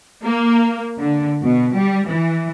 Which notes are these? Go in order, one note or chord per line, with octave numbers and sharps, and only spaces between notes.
A#3
D3
B2
G3
E3